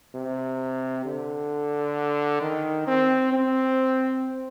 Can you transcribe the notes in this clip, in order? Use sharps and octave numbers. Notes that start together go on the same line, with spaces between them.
C3
D3
D#3
C4
C4